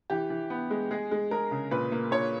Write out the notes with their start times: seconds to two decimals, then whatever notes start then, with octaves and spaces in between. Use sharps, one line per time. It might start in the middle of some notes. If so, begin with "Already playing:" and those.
0.10 E3 G4
0.30 E3
0.50 B3
0.70 G#3
0.91 G#3 G#4
1.11 G#3
1.31 G#3 A#4
1.51 C#3
1.71 A#2 B4
1.92 A#3
2.11 A#2 C#5